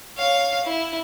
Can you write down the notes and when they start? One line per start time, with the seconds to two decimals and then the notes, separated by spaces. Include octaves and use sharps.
0.17 C#5 F5
0.64 E4